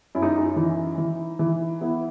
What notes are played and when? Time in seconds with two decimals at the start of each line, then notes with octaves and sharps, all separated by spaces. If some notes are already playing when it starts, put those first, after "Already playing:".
0.15 F#2 E4
0.22 D#4
0.37 D#4
0.56 E3
0.98 E3
1.39 E3
1.81 B3 E4